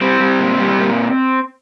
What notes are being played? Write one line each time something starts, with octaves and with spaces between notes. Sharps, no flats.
G3 C4
G3
A#2
G3
A#2